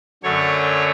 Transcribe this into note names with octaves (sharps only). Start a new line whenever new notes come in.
F#2 D3 F#3 A3 C#5